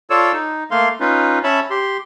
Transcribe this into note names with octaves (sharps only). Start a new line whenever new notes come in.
F4 A4 C#5 D5 E6
D#4
A3 A#3 F5 C6
C#4 D#4 F4 B4
C#4 C#5 E5 A5 B5
G4 C6